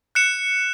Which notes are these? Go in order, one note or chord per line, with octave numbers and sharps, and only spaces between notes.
F#6 C#7 E7